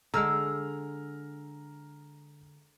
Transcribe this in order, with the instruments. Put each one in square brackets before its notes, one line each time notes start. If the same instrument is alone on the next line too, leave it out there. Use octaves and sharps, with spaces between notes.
[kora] D3 G#3 [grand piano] A#5 F6 [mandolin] E6